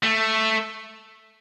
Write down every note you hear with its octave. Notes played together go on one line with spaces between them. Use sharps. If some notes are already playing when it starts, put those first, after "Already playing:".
A3